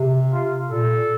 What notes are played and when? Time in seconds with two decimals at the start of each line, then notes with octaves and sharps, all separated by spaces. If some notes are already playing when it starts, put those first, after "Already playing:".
Already playing: C3
0.32 F4
0.70 A#2 A4